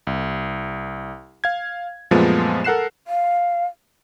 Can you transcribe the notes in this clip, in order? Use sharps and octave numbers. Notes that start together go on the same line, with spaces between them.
C2
F5 G#6
F#2 A#2 F3 G#3 A3 B3
A4 A#4 F#5 F#6 C7 E7
F5